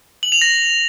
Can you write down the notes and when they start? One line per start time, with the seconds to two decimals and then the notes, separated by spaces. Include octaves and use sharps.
0.23 F#7
0.32 F7
0.42 A#6